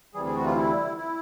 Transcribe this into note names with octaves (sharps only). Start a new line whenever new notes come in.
D2 C3 E3 G3 G#4
G#4
F#4
F4
E4
E4